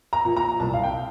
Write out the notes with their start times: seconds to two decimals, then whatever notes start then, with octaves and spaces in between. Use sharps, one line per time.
0.13 A#5
0.25 A#2 F3
0.37 A#5
0.60 C2 A5
0.74 F5
0.83 G5